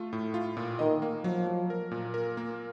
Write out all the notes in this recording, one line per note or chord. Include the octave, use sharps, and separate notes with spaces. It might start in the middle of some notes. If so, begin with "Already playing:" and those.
Already playing: A3 F4
A2
F4
A#2
D#3 D#5
A#3
F3 F#3
F#3
A#4
A#2
A#4
A#3